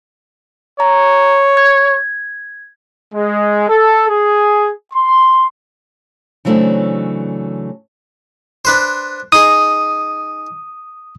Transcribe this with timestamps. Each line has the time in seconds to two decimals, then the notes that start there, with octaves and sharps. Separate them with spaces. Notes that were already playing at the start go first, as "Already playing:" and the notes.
0.80 C#5 A#5
1.57 G#6
3.14 G#3
3.69 A4
4.09 G#4
4.93 C6
6.45 C#3 E3 F#3 A3 C4 D4
8.65 D4 B4 C5
9.32 D#4 G#4 D#6